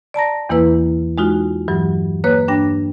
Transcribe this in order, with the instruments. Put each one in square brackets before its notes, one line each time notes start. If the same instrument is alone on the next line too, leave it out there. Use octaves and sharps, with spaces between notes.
[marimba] D5 A5 A#5 A#6
E2 E3 A#3 E4 B4
G#3 D#4 F4 F#4
G2 E3 F#3
A#3 B4 C#5 F#6
G2 D4 G5 A#6